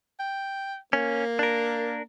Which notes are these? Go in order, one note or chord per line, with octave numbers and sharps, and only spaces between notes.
G5
A#3 C#4
D4 A#4